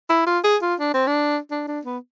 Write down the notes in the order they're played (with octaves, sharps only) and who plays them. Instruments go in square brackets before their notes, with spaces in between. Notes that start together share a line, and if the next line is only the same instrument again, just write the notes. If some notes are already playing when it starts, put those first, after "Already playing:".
[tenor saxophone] E4
F4
G#4
F4
D4
C4
D4
D4
D4
B3